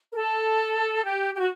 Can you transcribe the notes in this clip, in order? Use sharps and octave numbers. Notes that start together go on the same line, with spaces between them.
A#4
A4
G4
G4
F#4